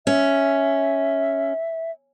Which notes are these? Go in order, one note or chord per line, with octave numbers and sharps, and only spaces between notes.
C#4 E5